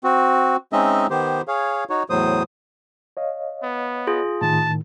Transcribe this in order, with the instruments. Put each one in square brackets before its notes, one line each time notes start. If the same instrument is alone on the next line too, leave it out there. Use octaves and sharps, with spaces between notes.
[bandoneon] C4 F#4
G#3 C4 C#4 D#4 D#5 E5
D#3 B3 G4 C5
G#4 C#5 F5
D#4 F#4 C#5
E2 A2 F#3 C5 D#6
[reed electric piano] C#5 D#5 F5
[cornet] B3
[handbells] F4 G#4
[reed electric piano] A2 D#3 [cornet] A5